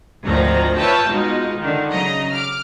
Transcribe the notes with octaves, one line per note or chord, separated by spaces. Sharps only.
G#1 D2 D#3 F3 A#5
F4 B4 C#5 E5 G5 A5
B2 G#3 D#4 F4
D3 D#3
C#3 F#3 D#5 A#5
D6 F6